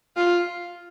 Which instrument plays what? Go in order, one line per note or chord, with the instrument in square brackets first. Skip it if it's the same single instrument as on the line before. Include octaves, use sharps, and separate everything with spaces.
[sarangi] F4